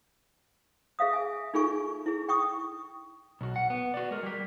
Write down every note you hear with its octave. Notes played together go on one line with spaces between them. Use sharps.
G#4 E5 F5 D#6
G#5
D#4 F4 G#4 A4 G#5 C#6
E4 G#4
G5 C#6 D#6
B1 F#4
F#5
B3
F#4 D5
G#3 A#4
G3 G4